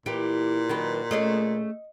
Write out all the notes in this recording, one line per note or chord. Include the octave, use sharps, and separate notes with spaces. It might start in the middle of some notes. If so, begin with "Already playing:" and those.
A#2 E3 G4
D#3 F#3 B4
A3 C#4 G#4 D#5